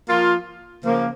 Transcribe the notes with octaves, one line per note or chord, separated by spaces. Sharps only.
F3 A#3 F4
C#3 F3 A#3